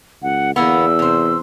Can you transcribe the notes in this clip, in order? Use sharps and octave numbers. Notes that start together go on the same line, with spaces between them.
C#2 F#5
E2 D3 A#3 B3 E6
C3 C5